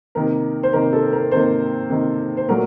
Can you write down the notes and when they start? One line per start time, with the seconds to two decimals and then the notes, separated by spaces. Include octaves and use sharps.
0.15 C3 D#3 A#3 A#4
0.63 C5
0.73 C3 D#3 A#3 A#4
0.93 A4
1.13 A#4
1.31 C3 D#3 A#3 C5
1.90 C3 D#3 A#3
2.37 C5
2.48 A#2 F#3 A3 A#4